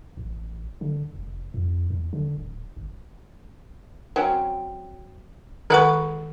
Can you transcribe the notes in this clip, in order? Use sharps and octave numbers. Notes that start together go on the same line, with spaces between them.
A1
D3
F1
F2
E2
D3
D1
G1
F#3 C4 C#4
D#3 F3 G#3 B4 F#5 C#6